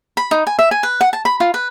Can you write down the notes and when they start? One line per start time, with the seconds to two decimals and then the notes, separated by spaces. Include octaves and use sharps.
0.17 B5
0.31 D#4
0.47 G#5
0.59 E5
0.71 G#5
0.83 B4
1.01 F#5
1.13 A5
1.25 B5
1.40 F4
1.54 B4